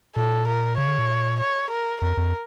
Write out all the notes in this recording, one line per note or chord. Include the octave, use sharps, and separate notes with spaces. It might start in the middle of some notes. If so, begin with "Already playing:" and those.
A#2 A4
A#4
C#3 C#5
D3
A#2
C#5
A#4
F2 A#4
F2